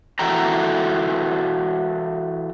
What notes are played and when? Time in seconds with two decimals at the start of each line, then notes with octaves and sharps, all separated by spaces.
0.19 E3 F#4 A4 G5 A#5